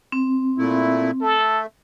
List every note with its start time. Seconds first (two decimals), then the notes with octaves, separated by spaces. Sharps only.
0.12 C4
0.58 A#2 A3 E4
1.21 A3 A4